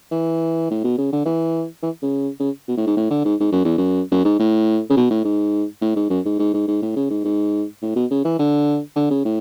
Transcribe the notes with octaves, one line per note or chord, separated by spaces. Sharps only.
E3
A2
B2
C#3
D3
E3
E3
C#3
C#3
B2
A2
G#2
A2
D3
G#2
G#2
F#2
E2
F#2
F#2
G#2
A2
C#3
B2
A2
G#2
A2
G#2
F#2
G#2
G#2
G#2
G#2
A2
C#3
G#2
G#2
A2
B2
C#3
E3
D3
D3
C#3
A2